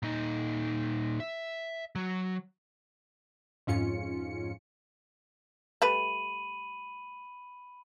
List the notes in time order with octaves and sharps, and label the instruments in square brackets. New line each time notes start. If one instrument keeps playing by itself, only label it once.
[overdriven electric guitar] A#2 D#4
E5
F#3
[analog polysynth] F2 G#2 C#4 F4 C#7
[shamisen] G3 A3 B4 [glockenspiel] B5 D#7 F#7